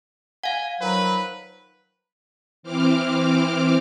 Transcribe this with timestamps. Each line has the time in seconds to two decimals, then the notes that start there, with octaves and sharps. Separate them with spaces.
0.44 F5 F#5 G#5
0.80 D#3 F3 F#3 B4
2.63 E3 C4 D6 F6